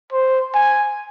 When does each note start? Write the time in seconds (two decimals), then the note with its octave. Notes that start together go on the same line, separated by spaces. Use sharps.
0.12 C5
0.54 G#5